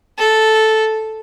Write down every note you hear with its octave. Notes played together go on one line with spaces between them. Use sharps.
A4